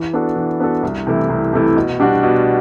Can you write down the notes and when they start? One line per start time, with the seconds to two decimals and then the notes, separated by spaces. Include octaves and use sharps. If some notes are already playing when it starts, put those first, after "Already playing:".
Already playing: E3
0.13 B3 D4 F#4 A4
0.36 E3
0.60 B3 D4 F#4 A4
0.83 C2
1.07 C3 E3 A3 E4
1.29 C2
1.53 C3 E3 A3 E4
1.76 B2
2.00 G3 D4 F#4
2.23 B2